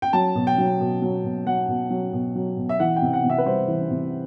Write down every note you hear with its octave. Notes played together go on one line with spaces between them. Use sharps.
G5
F#3 A5
B2
G5
F#3
B2
F#3
B2
F#3 F#5
B2
F#3
B2
F#3
B2
E5
E3 F#5
G5
C3
F#5
C3
E5
B4
G3 C5
E3
C3